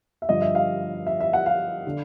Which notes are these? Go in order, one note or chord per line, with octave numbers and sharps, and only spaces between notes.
E5
G2 D3 F3 D#5
E5
F5
E5
E5
F#5
F5
D3